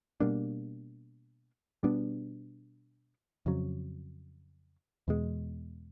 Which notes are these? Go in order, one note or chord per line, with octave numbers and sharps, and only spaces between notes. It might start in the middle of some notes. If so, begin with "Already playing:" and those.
B2 G3 A#3 D4
B2 G3 B3 D4
F2 C#3 F#3
E2 B2 G#3